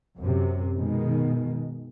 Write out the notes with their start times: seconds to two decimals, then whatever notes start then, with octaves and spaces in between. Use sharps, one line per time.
0.18 F#2 C3
0.77 B2 D#3 G#3